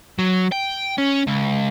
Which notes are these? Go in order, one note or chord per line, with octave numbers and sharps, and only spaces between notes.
F#3
G5
C#4
C#2